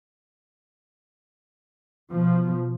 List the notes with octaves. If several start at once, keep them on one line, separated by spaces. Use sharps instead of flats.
B2 F3